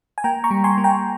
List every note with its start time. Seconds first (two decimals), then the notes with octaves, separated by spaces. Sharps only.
0.18 G#5
0.24 A#3 G5 A#5
0.44 A#5 C#6
0.51 G3
0.64 G#5 C6
0.78 A#3
0.84 G5 A#5